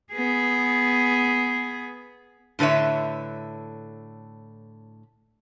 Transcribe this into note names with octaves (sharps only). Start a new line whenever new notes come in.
B3 G#4
A2 D3 B4 C#5 E5